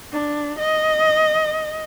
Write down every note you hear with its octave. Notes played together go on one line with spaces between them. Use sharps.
D4
D#5